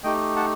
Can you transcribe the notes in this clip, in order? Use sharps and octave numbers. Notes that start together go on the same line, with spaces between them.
A3 D#4 G4 D#5 G5
F#5 A5